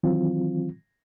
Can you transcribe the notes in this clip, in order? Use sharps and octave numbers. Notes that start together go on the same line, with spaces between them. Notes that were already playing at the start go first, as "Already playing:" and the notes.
D#3 E3 F#3 C4 F4